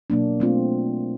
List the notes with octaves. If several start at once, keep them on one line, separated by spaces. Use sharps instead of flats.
B2 F#3 A#3 D4
A3 C4 F4